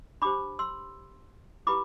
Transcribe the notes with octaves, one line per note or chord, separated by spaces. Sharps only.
D4 G4 C5 B5 D6
C6 E6
E4 G4 B4 B5 D6